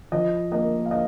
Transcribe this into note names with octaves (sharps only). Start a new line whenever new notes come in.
F3 D#5
A#3 D#5
F5
D#5